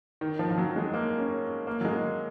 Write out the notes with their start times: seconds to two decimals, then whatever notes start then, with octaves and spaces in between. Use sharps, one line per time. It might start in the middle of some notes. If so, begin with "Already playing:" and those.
0.21 D#3
0.39 F3
0.51 F3
0.58 F#3
0.76 G#3
0.94 A#3
1.19 C#4
1.67 A#3
1.81 F#3
1.85 G#3